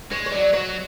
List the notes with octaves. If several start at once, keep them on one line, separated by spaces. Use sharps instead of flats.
G#3 C#5
C#5
F#3 D5
F#3 C#5